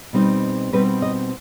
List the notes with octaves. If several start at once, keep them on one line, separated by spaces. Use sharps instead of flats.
B2 G3 C4 D#4
B2 G3 C4 D#4 B4
D#5